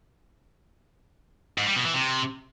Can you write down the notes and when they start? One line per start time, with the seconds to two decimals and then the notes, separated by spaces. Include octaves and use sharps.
1.58 G#2
1.67 G3
1.76 B2
1.85 E3
1.94 C3